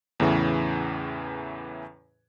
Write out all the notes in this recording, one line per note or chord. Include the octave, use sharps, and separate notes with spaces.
E2 A2 C#3 E3